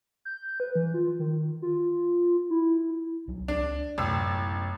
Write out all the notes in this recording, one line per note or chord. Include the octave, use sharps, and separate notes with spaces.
G6
B4
E3
F4
D#3
F4
E4
C2 F#3
C#2 D4
A1 F#2 C3 B3 E6